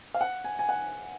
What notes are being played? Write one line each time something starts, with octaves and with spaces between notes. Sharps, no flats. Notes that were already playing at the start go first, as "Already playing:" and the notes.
F5
F#5
G#5
G#5
F#5